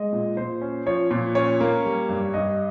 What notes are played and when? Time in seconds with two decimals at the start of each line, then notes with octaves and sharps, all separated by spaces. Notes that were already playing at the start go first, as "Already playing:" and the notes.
Already playing: G#3 D#5
0.13 A#2
0.37 A#2 C5
0.61 C#4
0.86 F3 C#5
1.11 A#2
1.35 C#4 C#5
1.60 A#3
1.85 G3
2.09 G2
2.34 G2 D#5